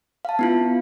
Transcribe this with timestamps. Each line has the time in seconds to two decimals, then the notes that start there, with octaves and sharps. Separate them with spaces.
0.25 F5 A5
0.39 B3 E4 F4